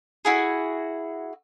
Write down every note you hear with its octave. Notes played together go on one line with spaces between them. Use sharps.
E4 F#4 G#4